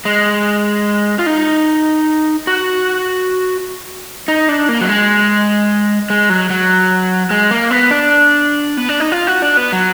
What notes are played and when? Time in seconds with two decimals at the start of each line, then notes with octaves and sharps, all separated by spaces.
0.05 G#3
1.19 F4
1.26 D#4
2.47 F#4
4.28 D#4
4.49 D4
4.69 A#3
4.81 F#3
4.89 G#3
6.10 G#3
6.29 F#3
6.50 F#3
7.31 G#3
7.51 A#3
7.71 B3
7.91 D4
8.77 B3
8.89 D4
9.00 D#4
9.12 F4
9.27 F#4
9.42 D4
9.57 B3
9.72 F#3